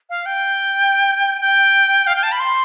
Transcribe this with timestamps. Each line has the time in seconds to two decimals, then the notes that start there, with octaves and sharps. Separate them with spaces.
0.10 F5
0.26 G5
1.41 G5
2.07 F5
2.16 G5
2.23 A5
2.32 B5
2.40 C6